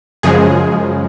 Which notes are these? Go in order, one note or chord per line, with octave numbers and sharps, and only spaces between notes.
F#2 C#3 F3 G#3 G#4